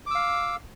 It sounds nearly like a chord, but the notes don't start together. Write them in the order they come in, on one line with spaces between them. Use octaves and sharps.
D6 E6 F5